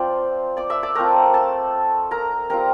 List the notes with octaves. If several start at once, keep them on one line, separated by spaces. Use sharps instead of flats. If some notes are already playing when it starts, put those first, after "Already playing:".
Already playing: F3 C4 F4 C5 D5 C6 D6
D5 D6
E5 E6
D5 D6
A3 C4 F4 A#4 A#5
A4 A5
A#4 A#5
G3 C4 F4 A#4 A#5